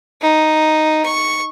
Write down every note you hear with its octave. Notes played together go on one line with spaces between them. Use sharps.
D#4
C#6